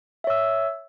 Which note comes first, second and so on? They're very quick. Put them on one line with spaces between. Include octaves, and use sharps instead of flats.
E5 C#5 E6